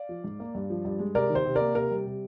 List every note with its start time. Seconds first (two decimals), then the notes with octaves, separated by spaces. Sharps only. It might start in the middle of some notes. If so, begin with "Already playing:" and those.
Already playing: D5 F5
0.09 F3
0.24 G#2
0.40 A#3
0.55 G2
0.70 F3
0.85 G2
1.00 G#3
1.15 C3 A#4 D5
1.30 D#3
1.35 C5
1.45 C3
1.55 A#3 A#4 D5
1.75 C3 A#4
1.91 G3
2.06 C3